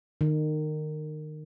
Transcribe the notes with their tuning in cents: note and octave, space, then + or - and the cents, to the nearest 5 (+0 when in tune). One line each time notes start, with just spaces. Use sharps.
D#3 -25